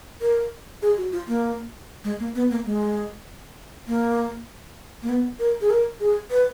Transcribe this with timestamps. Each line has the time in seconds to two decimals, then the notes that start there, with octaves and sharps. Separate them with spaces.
0.21 A#4
0.82 G#4
0.97 F#4
1.13 F4
1.28 A#3
2.04 G#3
2.20 A#3
2.35 B3
2.51 A#3
2.65 G#3
3.87 A#3
5.02 A#3
5.09 B3
5.39 A#4
5.61 G#4
5.70 A#4
6.00 G#4
6.31 B4